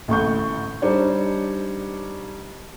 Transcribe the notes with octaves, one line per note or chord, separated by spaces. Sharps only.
A1 D2 C#6 G6
G3 D4 D#4 C5 C#5